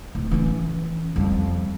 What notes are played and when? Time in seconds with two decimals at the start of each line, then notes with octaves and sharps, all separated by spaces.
0.15 D1
0.31 E3 C#4
1.16 F2 G3